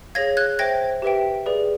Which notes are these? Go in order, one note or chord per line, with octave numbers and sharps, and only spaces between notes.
G#4 C#5 F5 G#6 A#6
F#6 G#6
C5 E5 G5 G#6 A#6
G4 B4 E5 G5
G#4 B4 D5